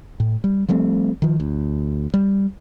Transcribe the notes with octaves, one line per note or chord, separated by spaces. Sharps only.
A2
G3
F3 G3 A3 C4
D#3 F3
D2
G3